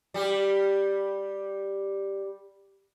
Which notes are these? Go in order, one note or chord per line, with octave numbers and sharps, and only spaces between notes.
G3 G4